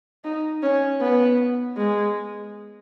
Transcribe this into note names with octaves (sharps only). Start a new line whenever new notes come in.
D#4
C#4
B3
G#3